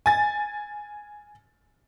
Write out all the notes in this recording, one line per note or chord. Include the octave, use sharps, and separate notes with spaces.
G#5 A6